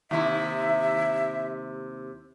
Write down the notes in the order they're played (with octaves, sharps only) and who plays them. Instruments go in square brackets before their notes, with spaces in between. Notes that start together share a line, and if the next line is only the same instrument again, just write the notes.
[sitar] D#2 C3 E4 [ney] E5